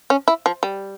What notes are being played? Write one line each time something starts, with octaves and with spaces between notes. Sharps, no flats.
C#4
E4
F3
G3